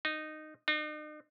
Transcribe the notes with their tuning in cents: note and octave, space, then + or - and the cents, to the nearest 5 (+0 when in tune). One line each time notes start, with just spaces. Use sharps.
D#4 -15
D#4 -45